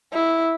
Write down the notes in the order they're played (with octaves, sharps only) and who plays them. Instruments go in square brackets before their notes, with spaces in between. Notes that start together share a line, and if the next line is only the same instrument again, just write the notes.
[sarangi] E4